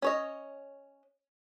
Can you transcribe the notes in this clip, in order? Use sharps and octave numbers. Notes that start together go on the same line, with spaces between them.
C#4 C#5 D#5